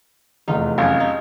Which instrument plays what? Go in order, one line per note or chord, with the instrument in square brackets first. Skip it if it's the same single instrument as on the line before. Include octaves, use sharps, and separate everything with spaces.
[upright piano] F1 E2 [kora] D#4 F4
[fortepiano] G#1 F#2 [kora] G4 G#4 [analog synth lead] F5
[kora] D#4